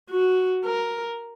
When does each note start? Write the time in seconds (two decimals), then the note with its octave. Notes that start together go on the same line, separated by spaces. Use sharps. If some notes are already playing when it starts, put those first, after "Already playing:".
0.10 F#4
0.65 A#4